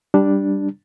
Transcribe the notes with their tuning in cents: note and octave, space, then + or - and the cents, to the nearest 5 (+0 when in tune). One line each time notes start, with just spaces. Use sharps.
G3 +0 D4 +0